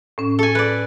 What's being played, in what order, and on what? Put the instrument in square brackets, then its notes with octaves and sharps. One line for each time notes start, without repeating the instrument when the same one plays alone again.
[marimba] A2 C#4
[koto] A4 G#5
B4 D5